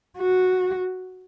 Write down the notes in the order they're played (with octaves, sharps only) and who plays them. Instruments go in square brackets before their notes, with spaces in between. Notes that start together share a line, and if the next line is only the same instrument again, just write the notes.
[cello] F#4